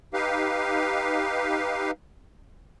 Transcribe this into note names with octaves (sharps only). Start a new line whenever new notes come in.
D#4 G4 B4 F5